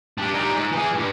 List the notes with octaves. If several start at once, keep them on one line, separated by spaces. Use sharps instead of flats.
G3 D4
G3 D#4
G#2
E3 G#4
G2